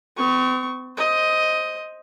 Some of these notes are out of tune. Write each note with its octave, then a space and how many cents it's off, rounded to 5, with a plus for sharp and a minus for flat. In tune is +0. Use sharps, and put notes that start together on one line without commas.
C4 -45 C#6 +0
C5 +0 D#5 +10